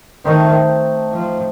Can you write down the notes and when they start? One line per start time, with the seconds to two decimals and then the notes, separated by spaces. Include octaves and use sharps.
0.25 D#3 A3 C4 D#4
1.13 F3